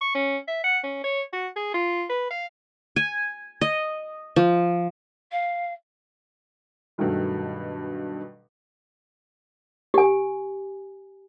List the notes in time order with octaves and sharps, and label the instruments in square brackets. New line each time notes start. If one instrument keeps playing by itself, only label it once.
[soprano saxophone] C#6
C#4
E5
F#5
C#4
C#5
F#4
G#4
F4
B4
F5
[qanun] G#5
D#5
F3
[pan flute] F5
[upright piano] G2 B2 D#3 F#3 G3 A3
[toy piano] G4 G#5